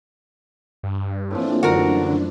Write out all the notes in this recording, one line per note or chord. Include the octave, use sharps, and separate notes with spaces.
G2
A2 E3 F3 A#3 C4 D4
F#2 D3 D4 F#4 A#4